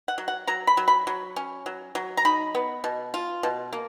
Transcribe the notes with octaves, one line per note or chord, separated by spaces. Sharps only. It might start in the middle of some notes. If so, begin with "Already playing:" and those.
F#5
F#3
F#5
F#3 A#5
B5
F#3
B5
F#3
C#4
F#3
F#3
A#5
D#4 B5
B3
B2
F4
B2
A#3